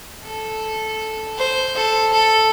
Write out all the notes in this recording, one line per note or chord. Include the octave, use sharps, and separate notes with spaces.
A4
C5
A4
A4